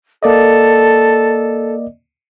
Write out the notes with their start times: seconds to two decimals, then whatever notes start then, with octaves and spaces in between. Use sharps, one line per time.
0.23 A#3 A4 D5 D#5